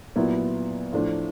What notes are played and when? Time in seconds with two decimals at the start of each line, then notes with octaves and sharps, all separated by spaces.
0.16 A#2 F#3 B3 E4
0.93 A2 F3 A3 D4 F4